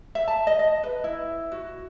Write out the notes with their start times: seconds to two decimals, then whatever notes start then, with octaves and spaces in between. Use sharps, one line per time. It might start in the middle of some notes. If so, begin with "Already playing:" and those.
0.15 E5
0.28 A5
0.47 D#5
0.59 D#5
0.83 B4
1.04 E4
1.52 F#4